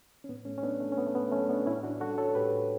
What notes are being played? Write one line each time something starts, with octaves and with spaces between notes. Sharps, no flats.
C#4
A2 B3
A3 C#4
C#4
F#3 B3 D4
A3
C#4
A2 B3
A3
B3
F#3 A3 C#4
B3 D4
A2 C#4 E4
D4 F#4
G3 F#4 A4
A4 C#5
A2 G4 B4